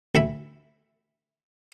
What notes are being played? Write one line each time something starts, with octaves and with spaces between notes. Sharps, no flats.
D2 E4 B5